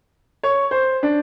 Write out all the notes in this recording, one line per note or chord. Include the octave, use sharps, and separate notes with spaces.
C#5
C5
D4